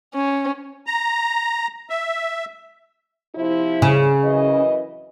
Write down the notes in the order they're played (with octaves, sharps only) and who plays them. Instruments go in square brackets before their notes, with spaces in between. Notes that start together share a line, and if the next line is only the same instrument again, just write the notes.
[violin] C#4
[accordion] A#5
E5
[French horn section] C3 F3 E4
[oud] C#3
[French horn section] F#2 E3 D#5